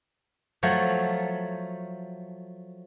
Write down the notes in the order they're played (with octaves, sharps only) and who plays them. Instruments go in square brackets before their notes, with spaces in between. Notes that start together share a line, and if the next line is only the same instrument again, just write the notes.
[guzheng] F3 F#3 A3